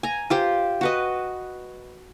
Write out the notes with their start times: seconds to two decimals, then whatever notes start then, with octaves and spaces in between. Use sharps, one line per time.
0.03 G#5 A#5
0.30 F4 G4 C5
0.81 F#4 B4 D#5